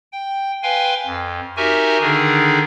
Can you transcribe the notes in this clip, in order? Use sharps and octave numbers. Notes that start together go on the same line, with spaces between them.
G5
B4 F5 G5 G#5 C6
F2
D#4 F#4 G4 A#4 E5 G#5
D3 D#3 D4 D#4 G#4